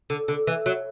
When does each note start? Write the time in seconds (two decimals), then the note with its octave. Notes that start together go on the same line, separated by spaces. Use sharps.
0.10 D3
0.28 D3
0.47 E3
0.66 F#3